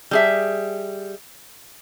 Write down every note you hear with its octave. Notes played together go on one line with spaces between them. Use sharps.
G3 G#4 E5